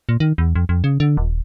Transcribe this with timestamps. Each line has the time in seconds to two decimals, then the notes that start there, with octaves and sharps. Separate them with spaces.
0.09 A#2
0.20 D#3
0.38 E2
0.55 F2
0.69 F2
0.84 C#3
1.00 D3
1.17 D#1